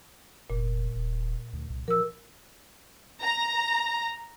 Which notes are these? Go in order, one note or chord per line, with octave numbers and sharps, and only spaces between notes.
F1 A#2
D#1
D2
C2
F3 A#4 E6
A#5